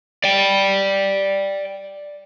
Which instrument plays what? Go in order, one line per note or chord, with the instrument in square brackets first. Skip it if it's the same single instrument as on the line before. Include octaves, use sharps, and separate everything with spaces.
[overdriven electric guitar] D5 G5